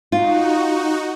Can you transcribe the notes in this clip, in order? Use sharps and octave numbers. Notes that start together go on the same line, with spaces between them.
D#4 F4 F#4